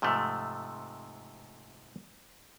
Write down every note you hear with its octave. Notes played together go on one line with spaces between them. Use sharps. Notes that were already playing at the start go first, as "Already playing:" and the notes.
G#2 C3 F3 A3